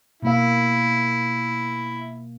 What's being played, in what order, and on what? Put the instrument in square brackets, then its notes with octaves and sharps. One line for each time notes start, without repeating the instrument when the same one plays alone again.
[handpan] B2 A#3 F5 [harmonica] E4